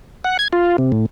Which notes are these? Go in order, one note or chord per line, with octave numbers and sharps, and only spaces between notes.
F#5
G#6
F4
C3
A2